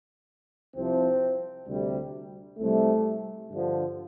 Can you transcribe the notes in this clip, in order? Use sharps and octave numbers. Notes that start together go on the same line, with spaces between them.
C2 C3 F3 C4
D2 C3 G3
C2 C3 G3 A3
G2 D3 F3